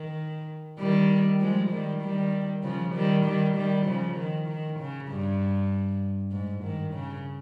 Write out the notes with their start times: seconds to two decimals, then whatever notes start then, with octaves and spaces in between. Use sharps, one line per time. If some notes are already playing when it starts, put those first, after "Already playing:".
Already playing: D#3
0.79 D#3 G3
1.40 F3 G#3
1.71 D#3 G3
2.02 D#3 G3
2.63 C#3 F3
2.95 D#3 G3
3.24 D#3 G3
3.56 D#3 G3
3.86 C#3 F3
4.17 D#3
4.48 D#3
4.79 C#3
5.09 G2
6.32 G#2
6.64 D#3
6.94 C#3